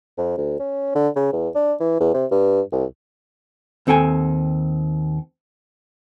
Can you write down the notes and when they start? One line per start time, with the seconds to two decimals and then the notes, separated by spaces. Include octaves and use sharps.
0.18 F2
0.38 D2
0.60 C#4
0.95 D3
1.16 C#3
1.33 E2
1.55 D4
1.80 E3
2.00 E2
2.14 C3
2.31 G2
2.72 C2
3.87 D#2 C4 A4 G5 G#5